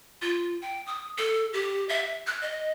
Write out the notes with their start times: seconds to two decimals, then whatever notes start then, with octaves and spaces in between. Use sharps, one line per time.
0.22 F4
0.62 G5
0.86 D#6
1.18 A4
1.53 G4
1.89 E5
2.27 F#6
2.41 D#5